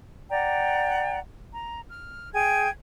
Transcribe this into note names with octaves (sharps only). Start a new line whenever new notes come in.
D5 F#5 G5 A#5
A#5
F6
G#4 G5 G#5 G#6